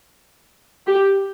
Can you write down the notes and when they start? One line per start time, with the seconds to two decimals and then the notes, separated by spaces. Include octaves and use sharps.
0.87 G4